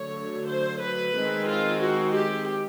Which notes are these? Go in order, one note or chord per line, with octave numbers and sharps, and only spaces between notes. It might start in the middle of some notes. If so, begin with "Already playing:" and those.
Already playing: D3 F#3 A3 C#5
C5
B4
D#3 G#3 C4
F4
F#4
G4